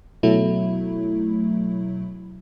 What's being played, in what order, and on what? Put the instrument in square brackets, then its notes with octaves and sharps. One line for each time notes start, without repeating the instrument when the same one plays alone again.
[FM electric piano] B2 F#3 A3 E4